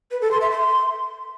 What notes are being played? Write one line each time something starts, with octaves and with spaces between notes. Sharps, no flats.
B4
A4
C6
E5
C6